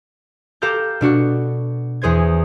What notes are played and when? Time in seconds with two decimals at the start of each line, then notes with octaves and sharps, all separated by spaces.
0.62 G4 A4 F5 A#5 D6 G6
1.01 B2 D4 F#4 F#5
2.02 E2 G#4 C5 G#6